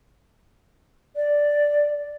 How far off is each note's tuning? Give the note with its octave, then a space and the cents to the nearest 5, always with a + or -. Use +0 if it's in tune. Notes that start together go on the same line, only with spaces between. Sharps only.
D5 +0